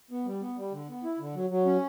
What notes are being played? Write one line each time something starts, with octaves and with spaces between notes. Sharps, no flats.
B3
G3
B3
G3
D3
B3
E4
D3
F#3
F#3
C#4